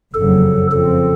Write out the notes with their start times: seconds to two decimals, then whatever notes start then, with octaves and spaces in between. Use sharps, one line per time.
0.14 F#1 F2 C#3 F#3 A4
0.71 F2 C#3 F3 C4 A4